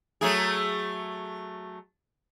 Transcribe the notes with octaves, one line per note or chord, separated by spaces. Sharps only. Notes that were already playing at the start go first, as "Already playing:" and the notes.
F#3 A3 G#4